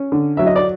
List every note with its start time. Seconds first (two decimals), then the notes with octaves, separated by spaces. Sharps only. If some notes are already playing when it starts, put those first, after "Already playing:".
Already playing: C#4
0.12 D3
0.37 F#3 E5
0.46 D#5
0.56 D5